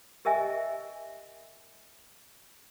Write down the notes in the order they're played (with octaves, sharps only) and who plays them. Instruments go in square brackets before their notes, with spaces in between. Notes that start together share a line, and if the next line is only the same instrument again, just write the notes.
[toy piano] G4 A#4 D#5 E5 G#5